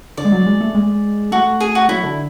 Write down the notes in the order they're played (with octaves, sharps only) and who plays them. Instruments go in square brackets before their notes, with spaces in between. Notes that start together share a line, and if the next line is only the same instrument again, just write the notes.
[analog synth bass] D3 [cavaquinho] D5
[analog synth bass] G#3
F#3
G#3
A3
G#3
[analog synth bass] A3 [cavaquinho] F#4
[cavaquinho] G#4
F#4
[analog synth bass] F#3 [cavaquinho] E4
[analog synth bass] D3